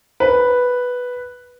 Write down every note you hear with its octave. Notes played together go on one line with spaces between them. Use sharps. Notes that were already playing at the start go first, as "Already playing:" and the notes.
B4